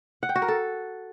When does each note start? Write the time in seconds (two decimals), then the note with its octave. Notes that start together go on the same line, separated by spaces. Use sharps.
0.23 F#5
0.29 G5
0.36 F#4
0.42 A#4
0.48 A4